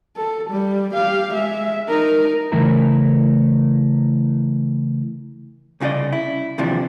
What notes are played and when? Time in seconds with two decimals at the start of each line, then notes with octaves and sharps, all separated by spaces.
0.16 A4
0.50 G3
0.94 G4 F5
1.34 G#3 E5
1.88 D#4 A#4
2.52 C#3 E3 A3 E4 A#4 A#5
5.80 C2 C#3 F#4 G4 D5 D#5
6.13 E4
6.58 D#2 C3 E3 F3 D4